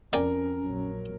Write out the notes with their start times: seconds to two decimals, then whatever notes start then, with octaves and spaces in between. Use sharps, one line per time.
0.13 F2 C#4 A#4 D5 G5 G#5
0.63 A#1 F#3